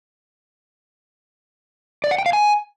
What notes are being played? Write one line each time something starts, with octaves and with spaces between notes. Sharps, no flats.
D5
F#5
G5
F5
G#5